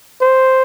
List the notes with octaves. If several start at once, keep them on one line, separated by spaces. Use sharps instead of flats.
C5